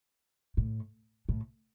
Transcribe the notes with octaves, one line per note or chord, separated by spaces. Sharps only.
A2
A2